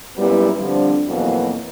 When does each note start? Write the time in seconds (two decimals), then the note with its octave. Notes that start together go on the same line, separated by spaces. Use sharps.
0.17 F#2 A#2 G3 B3 E4 B4
0.57 D3 F3 G3 C4 D4
1.08 F2 B2 E3 F#3 A#3 F#4